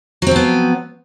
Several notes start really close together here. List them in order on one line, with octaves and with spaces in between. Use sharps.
F#3 C4 F3 B3